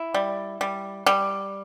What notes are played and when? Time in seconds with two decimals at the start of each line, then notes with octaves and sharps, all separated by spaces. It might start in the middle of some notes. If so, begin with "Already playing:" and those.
Already playing: E4
0.14 G3
0.61 G3
1.06 G3